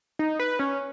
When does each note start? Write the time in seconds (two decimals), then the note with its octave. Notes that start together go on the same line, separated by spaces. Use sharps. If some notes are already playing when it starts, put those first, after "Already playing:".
0.19 D#4
0.39 B4
0.59 C#4